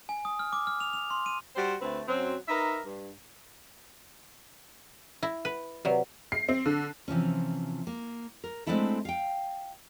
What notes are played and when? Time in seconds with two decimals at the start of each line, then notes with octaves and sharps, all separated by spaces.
0.09 G#5
0.25 D#6
0.39 F6
0.53 D6
0.67 F6
0.80 F7
0.93 F7
1.10 C6
1.26 D#7
1.56 G3 F#4 C5
1.81 D2 A3 C4 B4
2.07 F#2 F#3 C4
2.49 D#4 A#4 B4 E5
2.86 G2
5.23 E4
5.45 B4
5.85 C3 F#3 B4 D5
6.32 C7
6.49 C4
6.66 D3
7.08 C3 E3 F3 C#4
7.87 A#3
8.44 A#4
8.66 G#3 A3 C4 D4 E4 A4
9.05 F5 G5